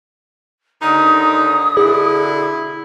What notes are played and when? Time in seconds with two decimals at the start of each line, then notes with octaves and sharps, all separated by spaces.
0.82 D#2 D3 D#4 D#6
1.77 B2 D3 E4 G#4